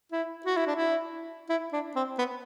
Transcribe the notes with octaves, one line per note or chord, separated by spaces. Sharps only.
E4
F#4
E4
D4
E4
E4
D4
C4
B3